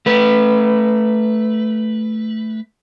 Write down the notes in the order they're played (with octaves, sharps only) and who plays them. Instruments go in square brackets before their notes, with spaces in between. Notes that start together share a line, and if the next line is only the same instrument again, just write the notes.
[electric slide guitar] A3 B4